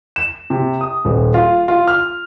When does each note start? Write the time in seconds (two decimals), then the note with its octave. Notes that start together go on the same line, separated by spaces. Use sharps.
0.16 E7
0.50 C3
0.81 D#6
1.05 D#1
1.34 F4
1.68 F4
1.87 F6